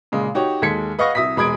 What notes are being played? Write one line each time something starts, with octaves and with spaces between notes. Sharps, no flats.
A#2 C#3 G#3
D#4 F#4 G4 C#5
D#2 G#3 A4 G#6 B6 C#7
B4 D#5 F5 F#5 C#6 A#6
C2 E5 D#6 A#6 B6
E1 G#3 B5 D#6 G#6 D7